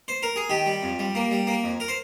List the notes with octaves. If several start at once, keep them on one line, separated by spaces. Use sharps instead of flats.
C5
A#4
G#4
D#3 G4
G3
F2
G3
A#3
G3
A#3
F2
A#4
C5